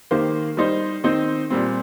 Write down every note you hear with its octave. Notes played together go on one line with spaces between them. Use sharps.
D#3 A#3 G4 C5
G3 D#4 C5
D#3 C4 D#4 C5
A#2 G3 C4